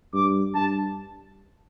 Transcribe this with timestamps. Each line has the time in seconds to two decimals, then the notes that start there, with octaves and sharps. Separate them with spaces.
0.14 G2 D6
0.55 G2 A5